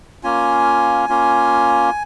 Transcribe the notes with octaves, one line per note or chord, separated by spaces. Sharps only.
A#3 C#4 F4 G#5
A#3 C#4 F4